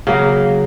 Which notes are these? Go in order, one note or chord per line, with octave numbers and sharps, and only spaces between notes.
C#3 F#3 A#3